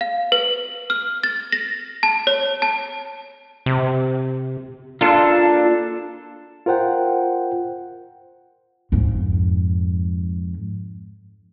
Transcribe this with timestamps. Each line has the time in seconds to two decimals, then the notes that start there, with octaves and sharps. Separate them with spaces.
0.01 F5
0.32 B4
0.90 F6
1.23 A6
1.52 A#6
2.03 A5
2.27 C#5
2.62 A5
3.66 C3
5.01 A#3 D4 F4 A4
6.66 F4 A#4 C5 F#5 G5
8.92 F2 G#2